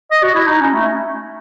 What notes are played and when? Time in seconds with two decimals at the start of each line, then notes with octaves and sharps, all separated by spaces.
0.11 D#5
0.23 F#4
0.35 E4
0.47 D#4
0.60 C#4
0.73 A3